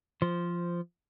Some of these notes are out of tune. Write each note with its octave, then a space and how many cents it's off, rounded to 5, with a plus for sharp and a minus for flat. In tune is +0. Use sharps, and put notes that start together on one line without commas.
F3 -10 C5 +0